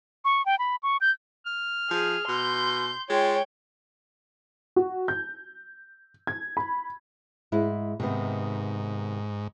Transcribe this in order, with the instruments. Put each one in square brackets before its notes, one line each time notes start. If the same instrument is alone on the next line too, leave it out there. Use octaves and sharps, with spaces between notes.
[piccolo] C#6
G5
B5
C#6
G6
[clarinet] F6
[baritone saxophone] F3 [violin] G#4
[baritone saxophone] B2 [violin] C6 G6
[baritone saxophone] G#3 [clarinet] F4 [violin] C#5 G5
[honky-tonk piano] F#4
G6
G#6
B5
[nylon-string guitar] G#2 G#3 E4
[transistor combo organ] G#2 [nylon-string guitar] C3 D#3 B3